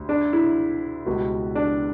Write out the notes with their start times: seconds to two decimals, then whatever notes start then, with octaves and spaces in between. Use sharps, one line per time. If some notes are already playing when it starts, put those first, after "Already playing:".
Already playing: D2 D3 G3
0.09 D4
0.33 E4
1.06 C#2 B2 G3 B3 F#4
1.55 D4